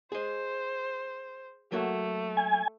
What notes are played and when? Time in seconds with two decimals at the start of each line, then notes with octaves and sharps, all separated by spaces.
0.12 G#4 C5 D#5
1.72 F#3 A3 A#3 F#4
2.37 G#5